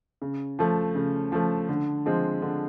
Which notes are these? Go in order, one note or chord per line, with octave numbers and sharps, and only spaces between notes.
C#3
F3 A3
C#3
F3 A3
D3
F3 G#3 C4
D3